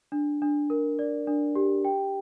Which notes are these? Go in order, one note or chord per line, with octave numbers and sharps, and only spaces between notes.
D4
D4
A#4
D5
D4
G4
G5